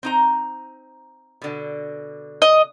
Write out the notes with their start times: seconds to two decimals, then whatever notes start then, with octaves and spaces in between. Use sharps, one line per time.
0.03 C4 D#4 A#5
1.42 B2 D3
2.42 D#5